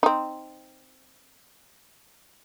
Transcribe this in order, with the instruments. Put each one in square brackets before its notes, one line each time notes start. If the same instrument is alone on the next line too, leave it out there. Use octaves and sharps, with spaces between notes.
[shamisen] C4 D#4